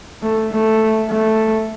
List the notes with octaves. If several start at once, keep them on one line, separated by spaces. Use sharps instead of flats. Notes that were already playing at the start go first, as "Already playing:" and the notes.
A3
A3
A3